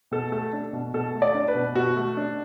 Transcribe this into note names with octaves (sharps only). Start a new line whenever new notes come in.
B2 A4
A3 A4
D4
B2
B2 A4
A3
D5
D4
B4
B2
B2 F#4
A3
D4